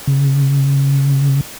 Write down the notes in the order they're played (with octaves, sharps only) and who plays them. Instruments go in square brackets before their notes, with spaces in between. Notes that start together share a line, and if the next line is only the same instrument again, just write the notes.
[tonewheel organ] C#3